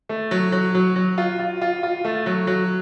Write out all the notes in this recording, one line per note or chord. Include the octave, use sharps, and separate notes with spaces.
A3
F#3
F#3
F#3
F#3
F4
F4
F4
F4
A3
F#3
F#3